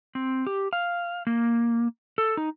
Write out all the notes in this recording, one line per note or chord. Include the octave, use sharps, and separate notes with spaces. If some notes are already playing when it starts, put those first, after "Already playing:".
C4
G4
F5
A#3
A4
D#4